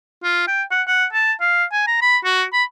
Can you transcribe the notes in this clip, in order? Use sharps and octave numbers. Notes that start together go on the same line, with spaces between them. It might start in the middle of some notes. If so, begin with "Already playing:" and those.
F4
G5
F#5
F#5
A5
F5
G#5
A#5
B5
F#4
B5